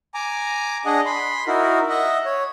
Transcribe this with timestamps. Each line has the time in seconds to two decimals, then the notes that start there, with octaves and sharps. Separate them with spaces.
0.14 G#5 A#5 D6
0.86 D4 G#4 D#5 F#5
1.06 B5 C6
1.47 D#4 E4 F#4 A#4
1.89 D#5 E5 F#5
2.26 C#5